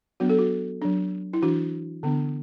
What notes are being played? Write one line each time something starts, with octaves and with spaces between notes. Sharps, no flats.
F#3 B3 D4 F#4
A4
F#4
F#3 D4
E4
E3 D4 F#4
D3 B3 D4